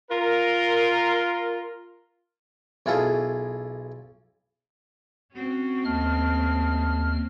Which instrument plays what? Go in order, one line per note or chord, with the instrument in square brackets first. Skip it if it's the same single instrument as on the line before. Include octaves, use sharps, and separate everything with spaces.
[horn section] F4 A#4
[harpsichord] B1 E4 F4 G#4 A4 D#6
[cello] C4 C#4 [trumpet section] F#4
[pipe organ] D#2 F6 [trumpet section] A3 D#5 A5